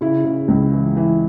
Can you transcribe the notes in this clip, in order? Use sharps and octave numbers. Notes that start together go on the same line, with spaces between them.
C#3 E4
C#3
C#2
E3
E3